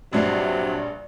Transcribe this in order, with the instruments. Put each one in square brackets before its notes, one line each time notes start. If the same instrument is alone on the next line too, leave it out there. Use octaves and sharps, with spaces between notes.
[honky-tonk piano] A#1 G2 C7 [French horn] C3 [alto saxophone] F#3